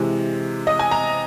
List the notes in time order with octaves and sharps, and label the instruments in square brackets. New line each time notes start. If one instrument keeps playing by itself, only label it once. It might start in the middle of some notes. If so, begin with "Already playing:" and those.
Already playing: [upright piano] C3 E3 G#3
D#5
G#5
A#5